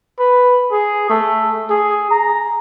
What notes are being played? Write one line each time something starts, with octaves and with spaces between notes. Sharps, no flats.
B4
G#4
A3
G#4
A#5